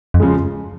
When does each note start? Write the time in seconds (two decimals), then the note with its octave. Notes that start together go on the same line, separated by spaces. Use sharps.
0.14 F2
0.20 C#3 F3 G#3